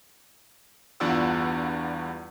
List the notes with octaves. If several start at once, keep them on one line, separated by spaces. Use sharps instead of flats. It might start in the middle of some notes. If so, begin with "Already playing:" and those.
E2 G2 F4 D5 F#5 E6